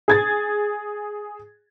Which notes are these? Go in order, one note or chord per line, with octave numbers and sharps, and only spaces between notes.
G#4 G#6 A6